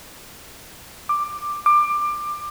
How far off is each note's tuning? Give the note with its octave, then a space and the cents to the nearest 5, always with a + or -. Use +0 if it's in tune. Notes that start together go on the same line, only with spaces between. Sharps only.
D6 +10
D6 +20